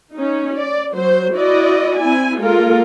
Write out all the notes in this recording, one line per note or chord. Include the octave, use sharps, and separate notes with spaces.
C#4 D#4
D5
F#3 C5
E4 F#4 D5 D#5
C4 E4 G#5
G#3 A#3 F4 A4 A#4